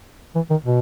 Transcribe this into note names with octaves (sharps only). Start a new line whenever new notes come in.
E3
D#3
B2